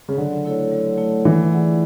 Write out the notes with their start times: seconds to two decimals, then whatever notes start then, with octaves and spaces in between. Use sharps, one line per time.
0.09 C#3
0.18 D3 F#3
0.44 A3 E4 A4 C#5
0.71 F#3
0.98 A3 E4 A4 C#5
1.24 E3 A3
1.51 E4 G#4 D5 F#5